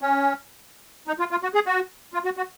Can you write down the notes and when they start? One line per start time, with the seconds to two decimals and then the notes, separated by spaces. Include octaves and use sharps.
0.01 C#4
1.07 D#4
1.19 F4
1.31 F4
1.43 F#4
1.54 G#4
1.66 F#4
2.14 F4
2.25 F#4
2.37 F#4